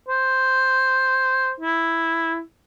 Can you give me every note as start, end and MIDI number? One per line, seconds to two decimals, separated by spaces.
0.09 1.54 72
1.60 2.41 64